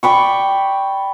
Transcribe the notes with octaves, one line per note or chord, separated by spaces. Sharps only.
D5 G5 B5 C#6